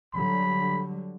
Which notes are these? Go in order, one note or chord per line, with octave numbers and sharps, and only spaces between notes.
D3 F#3 G3 B5